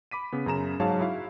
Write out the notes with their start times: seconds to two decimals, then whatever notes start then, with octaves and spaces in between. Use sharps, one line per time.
0.11 B5 D6 B6 D#7
0.33 C#3 B3
0.46 F#2 C#3 A#5 E7
0.80 G#2 F#3 G#4 C#5 F5 A5
1.00 E4 F#4 F5 C#6